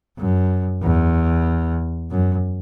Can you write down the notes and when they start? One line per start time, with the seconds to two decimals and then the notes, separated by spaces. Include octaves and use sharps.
0.18 F#2
0.83 E2
2.11 F#2